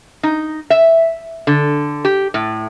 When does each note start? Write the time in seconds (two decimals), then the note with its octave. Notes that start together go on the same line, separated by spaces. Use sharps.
0.23 D#4
0.70 E5
1.47 D3
2.05 G4
2.34 A2